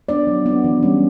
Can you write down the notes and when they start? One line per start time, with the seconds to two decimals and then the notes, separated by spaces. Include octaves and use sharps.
0.09 B3 D4 D5
0.27 F#3
0.46 B3 D4
0.64 E3
0.83 G3 C#4